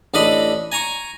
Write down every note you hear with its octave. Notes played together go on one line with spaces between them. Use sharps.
A1 D4 A4 D#5 B5
G#5 A#5 C#6